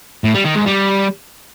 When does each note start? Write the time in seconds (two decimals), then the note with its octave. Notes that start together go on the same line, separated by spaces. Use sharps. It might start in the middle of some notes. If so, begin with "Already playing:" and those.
0.24 A2
0.35 G3
0.45 D#3
0.56 G#2
0.66 G3